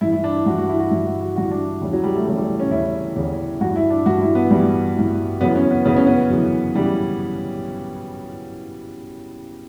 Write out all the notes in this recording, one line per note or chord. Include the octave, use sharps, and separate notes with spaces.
G2 E3 E4
E4
D4
E4
G2 E3 F#4
F#4
E4
F#4
G2 E3 E4
F#4
F#4
G2 E3 F#4
D4
E2 C#3 E3 G3
F#3
G3
A3
E2 C#3 E3 G3
G3
C#4
E2 C#3 E3 E4
E2 C#3 E3
G2 E3 F#4
E4
D4
G2 E3 F#4
E4
B3
G2 E3 G3
G2 E3
F#2 C#3 E3 B3
C#4
B3
F#2 C#3 E3 B3
C#4
B3
F#2 C#3 E3
C#3 E3 G3